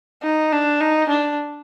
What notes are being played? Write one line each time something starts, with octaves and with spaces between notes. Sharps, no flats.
D#4
D4
D#4
D4